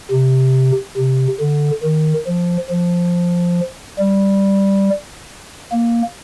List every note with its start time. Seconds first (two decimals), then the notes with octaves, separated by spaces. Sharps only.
0.11 C3
0.97 C3
1.40 D3
1.83 D#3
2.27 F3
2.70 F3
3.99 G3
5.72 A#3